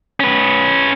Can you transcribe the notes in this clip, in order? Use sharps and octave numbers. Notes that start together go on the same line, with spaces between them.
C#4 B4